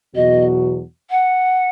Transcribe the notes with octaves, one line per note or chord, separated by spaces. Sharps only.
E2 B2 F#3 B3 F#4 D#5
F#5